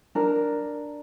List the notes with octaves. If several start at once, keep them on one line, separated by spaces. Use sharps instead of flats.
D4 A#4